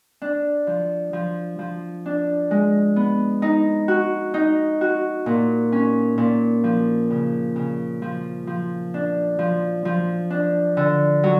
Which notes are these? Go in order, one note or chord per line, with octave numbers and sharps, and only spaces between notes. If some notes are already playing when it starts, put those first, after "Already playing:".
D4
F3
F3
F3
D4
G#3
B3
D#4
F#4
D#4
F#4
A#2
C#4
A#2
F3
C#3
C#3
F3
F3
D4
F3
F3
D4
D3
F#3